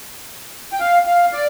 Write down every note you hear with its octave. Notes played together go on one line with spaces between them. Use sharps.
G5
F5
F5
D5